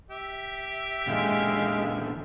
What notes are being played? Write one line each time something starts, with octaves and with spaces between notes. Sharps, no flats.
G4 E5
A#2 D3 E3 G#3 F5